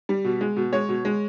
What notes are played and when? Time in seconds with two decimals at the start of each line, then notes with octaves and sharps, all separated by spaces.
0.09 G3
0.24 B2
0.41 G#3
0.56 B2
0.73 G#3 C#5
0.89 B2
1.05 G#3